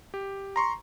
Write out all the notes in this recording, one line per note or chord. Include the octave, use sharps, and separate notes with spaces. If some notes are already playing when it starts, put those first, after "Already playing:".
G4
A#5 C6 C#6